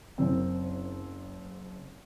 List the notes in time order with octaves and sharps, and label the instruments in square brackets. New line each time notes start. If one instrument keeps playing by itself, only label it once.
[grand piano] F#1 C4